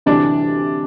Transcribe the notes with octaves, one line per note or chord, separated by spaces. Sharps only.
D2 C3 E3 D4 D5